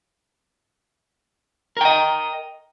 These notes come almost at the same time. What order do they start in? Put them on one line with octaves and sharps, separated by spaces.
A#4 G5 D#5